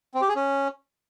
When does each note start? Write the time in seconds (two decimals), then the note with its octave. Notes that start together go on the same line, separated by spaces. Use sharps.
0.14 C4
0.21 G4
0.29 G#4
0.36 C#4